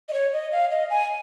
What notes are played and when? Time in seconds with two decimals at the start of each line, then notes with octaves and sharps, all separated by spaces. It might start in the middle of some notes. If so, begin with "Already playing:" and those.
0.09 D#5
0.13 C#5
0.33 D#5
0.52 F5
0.71 D#5
0.90 G#5